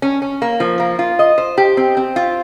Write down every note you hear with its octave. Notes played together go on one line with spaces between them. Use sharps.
C#4
C#4
A#3
F3
A#3
F4
D#5
C5
G4
C4
C4
F4